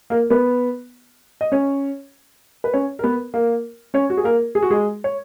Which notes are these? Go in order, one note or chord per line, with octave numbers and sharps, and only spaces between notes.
A#3 A#4
B3 B4
D#5
C#4 C#5
B4
C#4 C#5
A#4
B3 B4
A#3 A#4
C#4 C#5
F#4
G#4
A#3 A#4
G#4
F#4
G#3 G#4
C#5